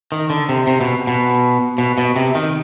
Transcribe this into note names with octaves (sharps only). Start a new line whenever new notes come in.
D#3
D3
C3
C3
B2
B2
B2
B2
C3
D#3